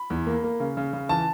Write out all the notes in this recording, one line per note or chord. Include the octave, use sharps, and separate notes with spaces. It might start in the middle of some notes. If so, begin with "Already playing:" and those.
Already playing: B5
E2
A#3
A#3
C#3
C#3
C#3
E3 A5